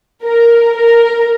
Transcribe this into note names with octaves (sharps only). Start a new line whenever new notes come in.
A#4
A#4